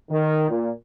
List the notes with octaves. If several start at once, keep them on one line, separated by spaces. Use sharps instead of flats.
D#3
A#2